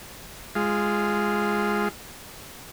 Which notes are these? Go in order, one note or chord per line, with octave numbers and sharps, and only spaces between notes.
G#3 F4